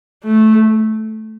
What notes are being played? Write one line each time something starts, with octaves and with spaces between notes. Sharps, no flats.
A3